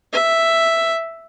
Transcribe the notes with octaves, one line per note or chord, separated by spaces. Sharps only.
E5